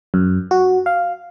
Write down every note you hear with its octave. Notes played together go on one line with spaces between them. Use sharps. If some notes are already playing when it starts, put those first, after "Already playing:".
F#2
F#4
F5